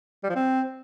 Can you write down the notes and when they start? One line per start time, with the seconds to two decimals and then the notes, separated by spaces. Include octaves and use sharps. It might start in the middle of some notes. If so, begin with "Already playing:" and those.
0.24 G3
0.30 F3
0.36 C4